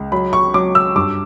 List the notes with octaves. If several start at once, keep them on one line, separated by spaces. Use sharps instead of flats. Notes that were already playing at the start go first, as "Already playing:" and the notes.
Already playing: C#2
F#3 B5
C#6
F#3 D6
E6
G2 D6